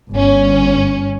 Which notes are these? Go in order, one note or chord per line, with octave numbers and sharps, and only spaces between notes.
G1 C#4